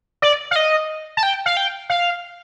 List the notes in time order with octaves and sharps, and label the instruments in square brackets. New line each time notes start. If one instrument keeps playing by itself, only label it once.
[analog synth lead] D5
F5
D#5
A5
G5
F5
G5
F5